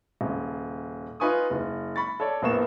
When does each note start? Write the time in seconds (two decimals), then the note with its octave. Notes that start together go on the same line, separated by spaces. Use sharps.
0.21 D#1 C#3
1.20 D#4 F4 B4 G#5 C#6 D#6
1.50 F#1
1.96 B5 C#6 A6
2.20 A4 C#5 D5
2.42 A#1 A2 A#3 B3 C#6 E7